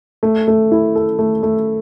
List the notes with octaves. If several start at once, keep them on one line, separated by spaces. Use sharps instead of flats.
A3
A3
E4
A4
A3
A3